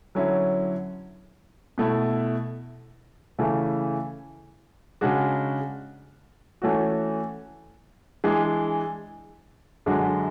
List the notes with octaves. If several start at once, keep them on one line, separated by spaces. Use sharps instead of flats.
D3 F#3 C#4 E4
B2 A3 E4
C#3 E3 A3 E4
C#3 G#3 D4 F#4
E3 A3 C#4 F#4
E3 G#3 D4
F#2 D3 G#3 D4 F#4